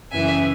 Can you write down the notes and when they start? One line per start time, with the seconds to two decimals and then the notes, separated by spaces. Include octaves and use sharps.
0.11 F#2 C#3 E3 E5 G#5